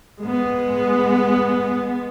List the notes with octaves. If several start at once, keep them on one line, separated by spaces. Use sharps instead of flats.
G#3 B3